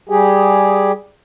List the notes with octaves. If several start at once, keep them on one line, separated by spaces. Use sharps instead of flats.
G3 G4 G#4